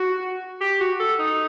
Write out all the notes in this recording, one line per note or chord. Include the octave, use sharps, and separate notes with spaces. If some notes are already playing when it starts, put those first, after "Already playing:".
Already playing: F#4
G4
F#4
A4
D#4